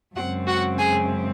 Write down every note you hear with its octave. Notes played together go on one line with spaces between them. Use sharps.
F#2 C#3 G#3 C4 F#4 F#5
F#4 F#5
G#4 G#5